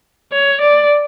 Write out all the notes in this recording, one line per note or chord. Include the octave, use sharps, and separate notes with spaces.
C#5
D5